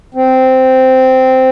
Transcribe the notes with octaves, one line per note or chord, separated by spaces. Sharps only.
C4